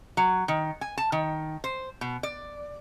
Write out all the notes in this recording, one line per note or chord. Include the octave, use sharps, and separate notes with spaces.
F#3
D#3
G#5
A5
D#3
C5
B2
D5